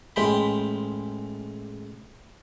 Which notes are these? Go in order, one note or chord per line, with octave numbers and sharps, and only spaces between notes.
A1 G#3 G5 B5